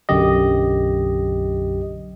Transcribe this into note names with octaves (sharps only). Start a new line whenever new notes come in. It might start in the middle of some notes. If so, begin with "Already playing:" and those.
B1 F#2 D3 G4 D#5